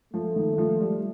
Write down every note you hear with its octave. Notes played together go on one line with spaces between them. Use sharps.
F3 A3
D#3
D#3
F3
G3